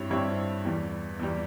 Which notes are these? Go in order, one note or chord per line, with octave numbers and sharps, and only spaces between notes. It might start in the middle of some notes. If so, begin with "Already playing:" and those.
Already playing: G2 G3 C4 E4 C#5
G2 G3 C4 E4 C#5
E2 E3 G3
E2 E3 G3